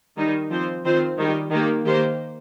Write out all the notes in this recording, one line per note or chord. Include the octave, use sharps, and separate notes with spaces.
D#3 G3 D#4
F3 C4 F4 C5
D#3 C4 F4 C5
D#3 G3 D#4 G4
D#3 A#3 G4
D#3 A#3 G4 C5